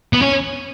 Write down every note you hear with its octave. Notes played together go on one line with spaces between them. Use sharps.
B3
C#4